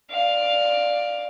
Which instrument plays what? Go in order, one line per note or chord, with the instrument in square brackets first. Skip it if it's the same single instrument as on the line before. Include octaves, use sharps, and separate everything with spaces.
[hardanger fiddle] D5 F5